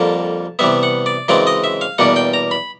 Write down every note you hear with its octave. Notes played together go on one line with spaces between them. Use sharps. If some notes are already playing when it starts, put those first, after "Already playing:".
Already playing: F2 D3 G3 A#3 A5
C3 E3 G3 B3 E5
F#5
D5
F#2 C#3 E3 G#3 C4 D5
D#5
E5
F5
E2 B2 G3 A#3 D4 F#5
G5
A#5
B5